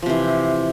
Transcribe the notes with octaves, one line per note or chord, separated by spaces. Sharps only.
C3 E3 F3